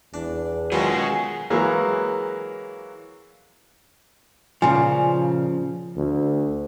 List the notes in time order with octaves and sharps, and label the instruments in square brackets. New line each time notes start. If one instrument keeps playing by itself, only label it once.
[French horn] E2 [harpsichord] D4
[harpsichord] B2 D#3 [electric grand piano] F#3 G#3 F4 [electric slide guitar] G#4 F5 G#5
[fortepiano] E3 F#3 G#3 A#3
[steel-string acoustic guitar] A#2 C#3 [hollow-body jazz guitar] F3 [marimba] G#5
[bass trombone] D2